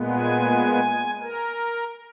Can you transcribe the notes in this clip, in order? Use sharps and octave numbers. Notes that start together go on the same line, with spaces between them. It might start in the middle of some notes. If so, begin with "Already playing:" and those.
Already playing: A#2 G#3 B3
G#5
A#4